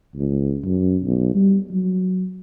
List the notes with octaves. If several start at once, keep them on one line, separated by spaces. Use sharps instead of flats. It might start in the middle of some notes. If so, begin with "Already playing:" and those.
C#2
F#2
B1
G3
F#3